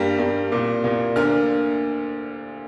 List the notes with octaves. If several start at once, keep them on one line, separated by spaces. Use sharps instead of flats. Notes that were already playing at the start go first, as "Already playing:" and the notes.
Already playing: G2 G3 A#3
G2 G3 A#3
C2 A#2 A#3 D6
C2 A#2 A#3
D2 D3 A#3 F6